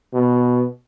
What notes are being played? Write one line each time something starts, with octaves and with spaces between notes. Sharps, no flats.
B2